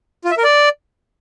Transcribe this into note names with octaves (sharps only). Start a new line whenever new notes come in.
F4
E5
A#4
D5